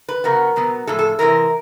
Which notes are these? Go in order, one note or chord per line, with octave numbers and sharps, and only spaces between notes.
B4
C#3 F#3 B3 A#4
B2 F#3 B3
A2 F3 G#3 A4
A4
C3 E3 G#3 A#4